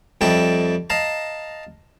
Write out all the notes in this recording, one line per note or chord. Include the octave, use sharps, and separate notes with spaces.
F2 G3 D#5 E5 G5 A5
D#5 F5 A5 A#5